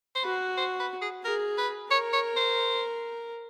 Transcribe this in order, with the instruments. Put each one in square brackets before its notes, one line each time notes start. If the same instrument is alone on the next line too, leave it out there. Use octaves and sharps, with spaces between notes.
[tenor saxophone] C5
[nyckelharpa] F#4 [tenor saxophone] B4
[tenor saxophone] C5
B4
G#4
[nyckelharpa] G#4 [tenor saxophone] A#4
[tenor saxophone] B4
[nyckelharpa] A#4 [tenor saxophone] C#5
[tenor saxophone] C#5
C5